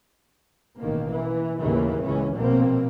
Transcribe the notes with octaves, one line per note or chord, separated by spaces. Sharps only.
A1 B2 D#3 A#3
E3
D#2 A2 C#3 E3 A#3
C#2 E3 C#4
A#1 B2 A#3 C4